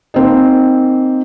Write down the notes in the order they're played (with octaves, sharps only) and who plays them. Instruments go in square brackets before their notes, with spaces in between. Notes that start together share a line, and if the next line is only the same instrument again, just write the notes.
[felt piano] A#3 C4 D#4